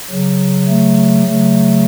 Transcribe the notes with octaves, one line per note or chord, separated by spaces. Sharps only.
C#3 F#3
A3
C#3 F#3 A3